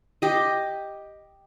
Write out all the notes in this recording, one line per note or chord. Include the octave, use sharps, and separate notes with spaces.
G4 D#5